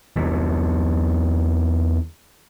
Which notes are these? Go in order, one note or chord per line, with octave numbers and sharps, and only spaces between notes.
E2 D3 E3